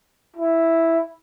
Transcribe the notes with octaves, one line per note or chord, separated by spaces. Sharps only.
E4